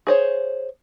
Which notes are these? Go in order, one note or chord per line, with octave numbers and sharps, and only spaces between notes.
G#4 C5 C#5